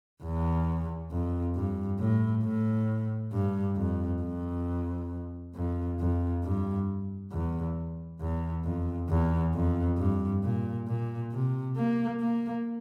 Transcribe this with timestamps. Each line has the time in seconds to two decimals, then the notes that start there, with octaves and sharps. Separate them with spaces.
0.23 E2
1.12 F2
1.56 G2
2.00 A2
2.44 A2
3.33 G2
3.77 F2
4.22 F2
5.55 F2
6.00 F2
6.44 G2
7.32 E2
8.21 E2
8.65 F2
9.09 E2
9.54 F2
9.98 G2
10.43 A#2
10.88 A#2
11.32 C3
11.76 A#3
12.20 A#3